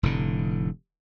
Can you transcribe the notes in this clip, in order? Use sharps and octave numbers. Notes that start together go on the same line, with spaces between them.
F1 A2 D3